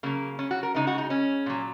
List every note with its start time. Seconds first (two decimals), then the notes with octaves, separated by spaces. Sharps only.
0.03 C#3 F#3 A#3
0.39 C#4
0.51 F#4
0.63 A#4
0.74 C#3 G#3 D#4
0.87 F#4
0.98 D#4
1.10 C#4
1.46 A#2 F#3